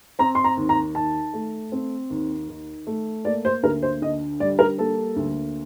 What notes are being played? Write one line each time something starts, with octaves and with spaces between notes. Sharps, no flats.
C4 A#5
C6
A#5
D#2
A#5
D#3 A5
A3
C4
D#2
D#3
A3
A#3 D5
C5
D2 A#4
C5
D3 D#5
G3 D5
A#4
A#3 A4
D2